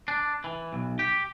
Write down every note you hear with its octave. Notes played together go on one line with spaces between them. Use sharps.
D4
E3
B1
G4